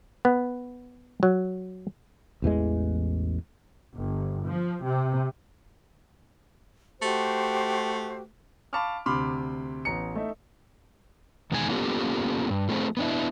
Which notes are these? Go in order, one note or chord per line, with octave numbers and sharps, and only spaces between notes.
B3
F#3
A1 E2 E3 G#3
G1
F3
C3
A3 F#4 G4 C5
F5 A5 B5 C#6 D6 F6
D2 C3 B5 C6 D6 F6
A1 B3 A#5 C#7
A3 D#4 E5
E2 B2 D#3 G#3 D4 G#5
A#3 B3 C#4 F4 G4 A4
G2
F3 A3 C4 F#4 G#4
B3 D4 E4